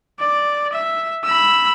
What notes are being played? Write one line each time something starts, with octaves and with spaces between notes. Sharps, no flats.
D5
E5
B5 E6